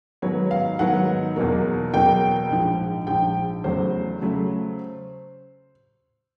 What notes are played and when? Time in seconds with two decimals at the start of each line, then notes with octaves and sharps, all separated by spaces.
0.22 G#2 D#3 F#3 B3 C#5
0.51 F5
0.79 G#2 D#3 F#3 B3 F#5
1.36 E2 B2 F#3 A#3
1.93 E2 B2 F#3 A#3 G5
2.50 A#1 G#2 F3
3.07 A#1 G#2 F3 G5
3.64 E2 C#3 F#3 A3 C5
4.22 C#3 F#3 A3